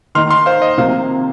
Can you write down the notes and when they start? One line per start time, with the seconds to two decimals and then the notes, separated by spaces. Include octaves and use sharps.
0.15 D#3 A#3 D#4 C6 F6
0.31 C6 F6
0.46 C5 F5
0.62 D#5
0.78 C3 F3 A#3 D#4 C5 F5